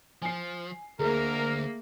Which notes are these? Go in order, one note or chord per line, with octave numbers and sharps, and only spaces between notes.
F3 G#5 C7
D2 A3 A#3 G#4 A#4